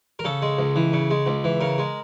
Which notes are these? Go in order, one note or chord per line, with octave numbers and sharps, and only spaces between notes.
A#4
C#3 A4
G#3
C#2
E3
C#3
G#3
C#2
E3
C#3 A#4
G#3